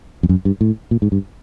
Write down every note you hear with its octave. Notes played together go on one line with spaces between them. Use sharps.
F2
F#2
G2
A2
A#2
G#2
G2